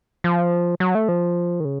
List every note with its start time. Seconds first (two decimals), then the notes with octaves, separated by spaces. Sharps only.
0.24 F3
0.80 F#3
0.95 A3
1.08 F3
1.60 D#3
1.65 C#3